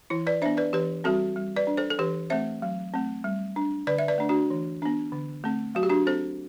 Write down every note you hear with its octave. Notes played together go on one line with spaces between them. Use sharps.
E3 E4
B4 D5
B3 D4 C5 E5
B4 D5
E3 G4 B4
G3 C4 F#4 A4
G3
B4 D5
D4
A4 C5
A4
E3 G4 B4
A3 C4 C5 E5
F#3
A3 C4
G3
D4
D3 B4 D5
E5
B4 D5
A3 D4
D4 F#4
E3
B3 D4
D3
A3 C4
F#3 F#4
G4
D4 F#4
C4 A4 C5